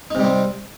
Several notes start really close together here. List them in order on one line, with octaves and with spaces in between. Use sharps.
D#4 C3 G3 C4